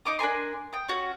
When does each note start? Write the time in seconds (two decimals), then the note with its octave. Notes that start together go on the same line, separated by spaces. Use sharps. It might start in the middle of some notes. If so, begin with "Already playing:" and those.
0.06 D#4 D6 D#6
0.19 D4 A#4 G#5 C6
0.73 G5 D#6
0.88 C#4 F#4 F#5